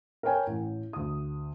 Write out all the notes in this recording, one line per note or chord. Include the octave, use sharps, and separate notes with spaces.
A#4 B4 C#5 G5 G#5
A1
D2 D#6